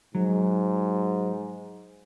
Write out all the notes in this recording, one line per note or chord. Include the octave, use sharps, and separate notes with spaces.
G#2 F#3